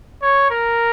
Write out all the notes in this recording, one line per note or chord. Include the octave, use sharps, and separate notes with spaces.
C#5
A#4